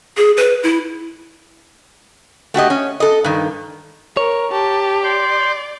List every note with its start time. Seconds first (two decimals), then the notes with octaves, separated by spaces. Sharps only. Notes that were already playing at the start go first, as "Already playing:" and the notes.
0.17 G#4
0.37 B4
0.63 E4
2.54 A3 F#4 G4 D#5
2.70 C#4
3.00 A4 D#5
3.24 G2 D#3
4.17 A#4 C#5
4.52 G4 A5
5.04 D5 C6 G6